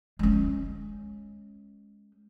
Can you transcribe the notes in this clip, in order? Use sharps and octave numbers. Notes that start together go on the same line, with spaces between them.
G#3 C#4